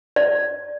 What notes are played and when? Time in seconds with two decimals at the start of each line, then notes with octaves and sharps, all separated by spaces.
0.16 D5